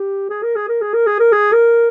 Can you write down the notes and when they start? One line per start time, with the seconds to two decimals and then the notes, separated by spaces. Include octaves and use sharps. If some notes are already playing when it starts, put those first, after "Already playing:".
Already playing: G4
0.30 G#4
0.43 A#4
0.56 G#4
0.69 A#4
0.82 G#4
0.94 A#4
1.07 G#4
1.20 A#4
1.32 G#4
1.52 A#4